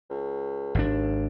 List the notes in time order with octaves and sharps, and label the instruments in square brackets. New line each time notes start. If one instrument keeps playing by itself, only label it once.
[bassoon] C#2
[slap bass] G#1 D4 [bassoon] D#2